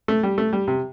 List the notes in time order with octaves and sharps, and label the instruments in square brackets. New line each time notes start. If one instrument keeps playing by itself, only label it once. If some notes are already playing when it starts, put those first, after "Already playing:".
[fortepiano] A3
G3
A3
G3
C3